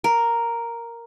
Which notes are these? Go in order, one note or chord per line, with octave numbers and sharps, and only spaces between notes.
A#4